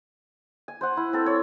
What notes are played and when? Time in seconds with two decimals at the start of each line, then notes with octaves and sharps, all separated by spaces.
0.68 G#5
0.81 C5 F#5
0.97 E4
1.13 C4 A4
1.26 C#5